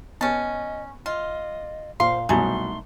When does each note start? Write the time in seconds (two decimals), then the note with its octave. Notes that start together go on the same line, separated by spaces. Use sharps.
0.21 B3 C#4 D#5 A5
1.06 F4 D#5
2.00 A#2 C5 F5 C6
2.29 C2 B2 F#3 A3 D#4 G#4 C6